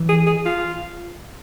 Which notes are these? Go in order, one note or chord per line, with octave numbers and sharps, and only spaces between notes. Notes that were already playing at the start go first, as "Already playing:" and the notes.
Already playing: E3
G#4
G#4
F4